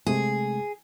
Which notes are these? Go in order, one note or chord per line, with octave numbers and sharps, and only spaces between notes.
C3 G#3 A3 G#4